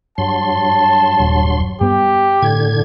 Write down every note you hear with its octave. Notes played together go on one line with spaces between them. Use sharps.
G2 F#3 A5 C6
D#1
G2 B3 G4
A2 D3 G#6